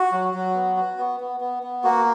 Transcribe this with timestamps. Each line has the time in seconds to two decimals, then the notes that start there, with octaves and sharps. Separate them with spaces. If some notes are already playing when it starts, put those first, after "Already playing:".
Already playing: F#4
0.12 F#3
0.34 F#3
0.55 B3
0.76 F#4
0.98 B3
1.20 B3
1.40 B3
1.63 B3
1.84 A#3 F#4